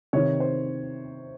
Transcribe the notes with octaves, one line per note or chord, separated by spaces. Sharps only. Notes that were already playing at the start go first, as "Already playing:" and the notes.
C3 D#3 C#5
C5